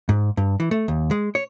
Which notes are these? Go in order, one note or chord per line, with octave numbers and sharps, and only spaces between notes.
G#2
G2
E3
A3
D#2
G#3
C#5